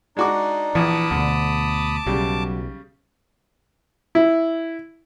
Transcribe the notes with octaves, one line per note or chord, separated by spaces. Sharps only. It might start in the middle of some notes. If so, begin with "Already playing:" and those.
G#3 D4 D#4 F#4 D6
A#1 E3 A5 B5 D6 D#6
D2 B2 D3
B1 C#3 F#3 G3
E4